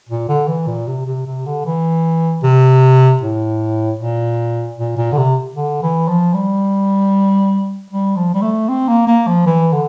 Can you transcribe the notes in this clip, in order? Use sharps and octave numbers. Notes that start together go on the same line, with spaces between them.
A#2
D3
E3
A#2
C3
C3
C3
D3
E3
C3
A2
A#2
A#2
A#2
D3
C3
D3
E3
F3
G3
G3
F3
G3
A3
C4
A#3
A#3
F3
E3
D3